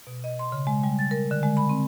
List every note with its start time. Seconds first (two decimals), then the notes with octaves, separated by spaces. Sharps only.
0.07 B2
0.24 D#5
0.39 C6
0.52 C#3
0.67 G#3
0.84 G3
0.99 A6
1.11 A#4
1.31 D3
1.43 G#3
1.57 B5
1.69 C4